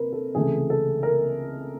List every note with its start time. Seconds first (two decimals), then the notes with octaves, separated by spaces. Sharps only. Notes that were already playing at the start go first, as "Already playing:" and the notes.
Already playing: C3 A#4 B4
0.13 A4
0.35 C#2 C3 E3 A3 G#4
0.70 A4
1.03 A#4